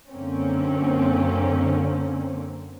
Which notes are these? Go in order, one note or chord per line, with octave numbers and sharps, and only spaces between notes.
F#2 D3 A#3 C4 C#4